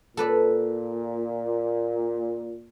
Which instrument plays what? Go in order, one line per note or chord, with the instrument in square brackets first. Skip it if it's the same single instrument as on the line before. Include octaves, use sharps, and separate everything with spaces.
[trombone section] A#2 [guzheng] A4 B4 D5